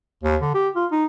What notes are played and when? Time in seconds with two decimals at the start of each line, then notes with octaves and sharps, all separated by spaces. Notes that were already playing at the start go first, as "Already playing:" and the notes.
0.23 D#2
0.41 D3
0.54 G4
0.75 F4
0.92 D#4